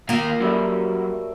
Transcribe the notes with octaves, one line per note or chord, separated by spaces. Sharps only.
D#2 A#3 F4 F5
F#2 F#3 G3 A3